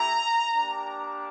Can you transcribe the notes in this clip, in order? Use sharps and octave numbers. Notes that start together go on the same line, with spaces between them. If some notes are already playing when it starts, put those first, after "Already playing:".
Already playing: A3 E4 G4 A#5
A#3 D4 G4